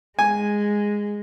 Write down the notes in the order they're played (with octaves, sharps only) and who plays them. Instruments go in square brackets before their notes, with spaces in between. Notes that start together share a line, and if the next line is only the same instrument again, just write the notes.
[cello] G#3 [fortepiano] G#5